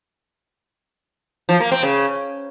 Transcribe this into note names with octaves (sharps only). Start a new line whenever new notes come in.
F3
A#3
C4
C#3